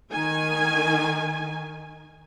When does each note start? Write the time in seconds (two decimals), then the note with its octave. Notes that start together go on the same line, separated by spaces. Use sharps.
0.13 D#3 G#5